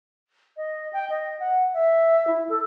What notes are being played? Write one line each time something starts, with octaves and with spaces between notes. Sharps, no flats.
D#5
G5
D#5
F#5
E5
E4
A4